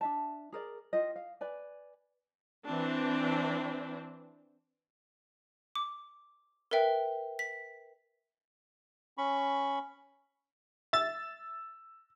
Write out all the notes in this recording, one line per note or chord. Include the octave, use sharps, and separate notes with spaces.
D4 E5 A5
G#4 A#4 D5
F4 G4 D#5
F5
B4 D5 G#5
E3 C4 D4
D6
A#4 B4 E5 G5
B6
C#4 B5 C#6
E5 E6 A6